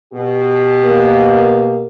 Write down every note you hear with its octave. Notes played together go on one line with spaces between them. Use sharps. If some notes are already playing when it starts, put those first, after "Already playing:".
B2 G4
A#3